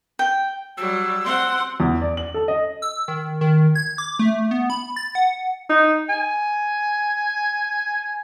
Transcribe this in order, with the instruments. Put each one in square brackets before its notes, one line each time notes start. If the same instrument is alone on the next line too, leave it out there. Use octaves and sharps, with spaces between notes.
[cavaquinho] G5
[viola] F#3 G3 [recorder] E6
[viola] C4 F#5 [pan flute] C6
[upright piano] E2
D5
F#7
A4
D#5
[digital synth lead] E6
D#3
D#3
G#6
D6
A3
B3
B5
A6
F#5
[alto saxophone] D#4
G#5